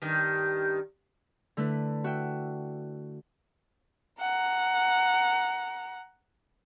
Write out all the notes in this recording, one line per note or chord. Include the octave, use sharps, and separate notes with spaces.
G2 D#3
D3 A3 E4 B4
F#4 E5 G5
F#5 A#5